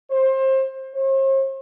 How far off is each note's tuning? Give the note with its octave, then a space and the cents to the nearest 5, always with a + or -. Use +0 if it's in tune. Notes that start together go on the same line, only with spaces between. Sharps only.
C5 +25
C5 +45